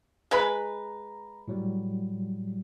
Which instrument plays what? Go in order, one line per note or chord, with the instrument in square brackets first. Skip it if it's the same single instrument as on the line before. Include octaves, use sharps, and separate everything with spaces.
[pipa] G#3 B4 B5 [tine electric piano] A#5
[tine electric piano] A2 F#3 G3